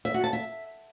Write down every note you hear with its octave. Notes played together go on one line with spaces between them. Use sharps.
E5
F#4
A5
E5